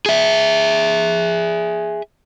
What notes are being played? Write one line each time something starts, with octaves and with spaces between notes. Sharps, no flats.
G#4 E5